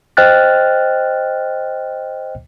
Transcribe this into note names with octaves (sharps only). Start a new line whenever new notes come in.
C5 D#5 G5 F6 F#6 A6